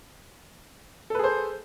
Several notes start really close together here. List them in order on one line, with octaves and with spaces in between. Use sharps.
A4 B4 G#4 C5